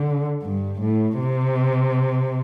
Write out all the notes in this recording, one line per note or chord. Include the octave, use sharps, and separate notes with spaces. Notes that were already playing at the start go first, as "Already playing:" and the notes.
Already playing: D3
G2
A2
C3